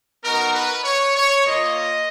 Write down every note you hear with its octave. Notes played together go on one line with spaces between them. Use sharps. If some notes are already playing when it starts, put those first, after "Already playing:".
B3 D#4 F#4 A#4
B4
C#5
C#5
A#3 F4 D#5